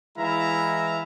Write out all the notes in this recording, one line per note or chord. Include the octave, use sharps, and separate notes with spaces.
E3 G#3 E4 E5 F5 A#5